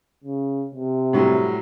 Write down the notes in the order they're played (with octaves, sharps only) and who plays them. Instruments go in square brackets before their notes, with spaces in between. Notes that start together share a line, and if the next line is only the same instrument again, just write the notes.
[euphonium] C#3
C3
[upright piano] A2 F#3 G3